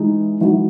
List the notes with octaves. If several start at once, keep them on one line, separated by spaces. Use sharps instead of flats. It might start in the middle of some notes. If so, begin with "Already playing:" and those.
Already playing: E3 G#3 D#4
E3 G#3 D#4 F#4